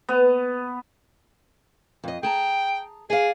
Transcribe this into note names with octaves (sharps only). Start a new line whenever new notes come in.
B3
F2 D#5
G#4 G5 A5 A#5
G#4 D5 F5